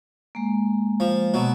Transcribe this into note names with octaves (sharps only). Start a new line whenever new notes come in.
G#3 A#3
F3
B2 F#3